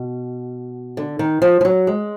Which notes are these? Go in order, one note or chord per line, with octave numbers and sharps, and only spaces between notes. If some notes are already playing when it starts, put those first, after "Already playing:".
Already playing: B2
D3
D#3
F3
F3
F#3
G#3